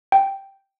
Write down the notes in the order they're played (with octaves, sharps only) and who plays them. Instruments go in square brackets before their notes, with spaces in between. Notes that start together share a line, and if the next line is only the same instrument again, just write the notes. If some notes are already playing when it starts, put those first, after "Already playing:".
[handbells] G5